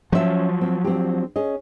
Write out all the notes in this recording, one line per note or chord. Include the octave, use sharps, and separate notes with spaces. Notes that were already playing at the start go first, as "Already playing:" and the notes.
F3 F#3 C#4 E5
C4
C4 D4 G4
C#4 G#4 D#5